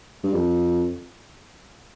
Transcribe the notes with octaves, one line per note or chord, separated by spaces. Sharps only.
G2
F2